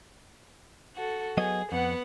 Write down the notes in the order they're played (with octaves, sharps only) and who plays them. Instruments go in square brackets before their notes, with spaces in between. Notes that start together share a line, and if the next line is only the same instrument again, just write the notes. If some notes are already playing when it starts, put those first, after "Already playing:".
[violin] F#4 A4
[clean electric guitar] F#3 B3 D#5 [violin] G#4
[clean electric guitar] F2 [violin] B3 F#5